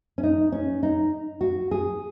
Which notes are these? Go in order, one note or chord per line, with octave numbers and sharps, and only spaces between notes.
C#4
D#4
C#4
D#4
F#4
G#4